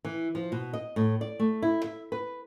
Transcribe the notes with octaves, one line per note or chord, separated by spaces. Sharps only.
E3
F3
B2
D#5
A2
D5
A3
E4
E5
B4